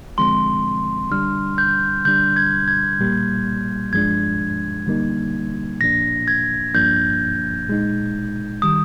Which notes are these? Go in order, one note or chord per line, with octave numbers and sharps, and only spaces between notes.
D3 F3 G#3 C4 C6
D3 G3 D4 F6
G6
D3 G3 D4 G6
G#6
G#6
A#2 G3 A#3
G2 F3 G#3 D4 G#6
D3 G3 A#3 D#4
A#2 F3 A#3 D4 A#6
G#6
G2 F3 A#3 D4 G6
A#2 G#3 D#4
D#3 G3 D#6